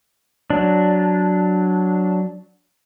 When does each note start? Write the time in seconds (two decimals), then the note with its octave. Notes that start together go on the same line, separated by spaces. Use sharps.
0.50 F#3 D4